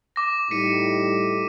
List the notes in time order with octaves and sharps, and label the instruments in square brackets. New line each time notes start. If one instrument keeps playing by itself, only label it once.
[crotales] D6 A#6
[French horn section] A2 G3 D#4 [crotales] B6 C#7 D#7